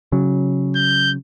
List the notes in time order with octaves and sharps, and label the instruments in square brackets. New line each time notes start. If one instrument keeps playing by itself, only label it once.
[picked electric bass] C#3 F#3
[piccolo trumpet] G6